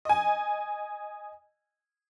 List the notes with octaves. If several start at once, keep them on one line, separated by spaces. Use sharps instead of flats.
D#5 G#5